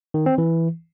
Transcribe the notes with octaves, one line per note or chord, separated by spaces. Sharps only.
D#3
C4
E3